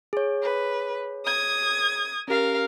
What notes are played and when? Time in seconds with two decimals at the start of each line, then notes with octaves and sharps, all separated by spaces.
0.13 G#4 C#5
0.43 B4
1.25 D#6 G#6
2.28 C#4 G4 A#4 F5